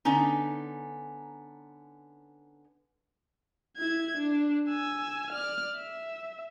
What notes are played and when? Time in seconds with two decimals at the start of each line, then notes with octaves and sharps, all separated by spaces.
0.05 D3 B3 C#4 D#4
3.77 E4 G#6
4.17 D4
4.69 G#5 E6
5.30 D5 F6
5.76 E5